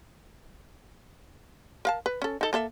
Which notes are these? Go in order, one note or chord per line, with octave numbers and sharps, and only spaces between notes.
A#4 F5 A5
B4
C#4 A4
D#4 A4
A#3 A4 E5